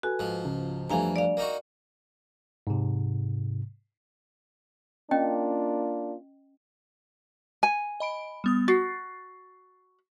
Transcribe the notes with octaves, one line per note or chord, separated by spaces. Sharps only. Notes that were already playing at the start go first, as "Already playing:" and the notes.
F#4 A4 B4 G#5
G#2 F3
C#2
F2 E3 G3 A3 D4 F5 G#5 A#5
D5 F5
A#3 D#4 F#4
G#2 C3
A#3 C#4 D4 F4 D#5 G5
G#5
D#5 B5 D7
G3 B3 D#6
F#4 A6 C7